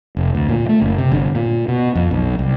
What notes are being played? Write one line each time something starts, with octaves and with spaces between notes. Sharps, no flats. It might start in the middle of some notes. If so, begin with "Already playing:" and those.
F1
D2
A#2
A3
F#1
C3
G1
A#2
B2
F2
B1
C2